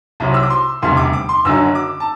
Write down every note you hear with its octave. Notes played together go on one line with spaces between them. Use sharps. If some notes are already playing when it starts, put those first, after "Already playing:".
C2 C3 F#3 C4
E6
D6
C6
E1 D2 C3 G3 C6
D6
D6
C6
F#1 F#2 D3 F#3 E6
D6
A5